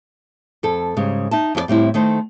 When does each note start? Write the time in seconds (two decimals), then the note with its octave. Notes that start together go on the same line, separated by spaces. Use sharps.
0.63 F2 A4
0.97 G#2 C#3 G3
1.31 D#4 E5 A5
1.55 F2 F#4 D5
1.68 A2 G3 C4 E4
1.94 D#3 A3 D#4 C5